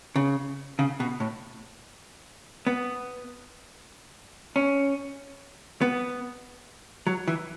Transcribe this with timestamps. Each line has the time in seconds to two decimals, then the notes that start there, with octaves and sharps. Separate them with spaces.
0.16 C#3
0.79 C#3
1.00 B2
1.20 A2
2.67 B3
4.56 C#4
5.81 B3
7.07 F#3
7.28 E3